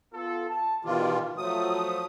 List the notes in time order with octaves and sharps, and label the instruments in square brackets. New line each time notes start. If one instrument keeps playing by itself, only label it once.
[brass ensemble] B3 F4 A4
A5
[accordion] B2 D#3 F4 [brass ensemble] E3 G4 D5
[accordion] F3 D#6 [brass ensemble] F#3 A3